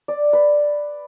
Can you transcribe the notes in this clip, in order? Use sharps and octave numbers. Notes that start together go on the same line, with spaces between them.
D5
B4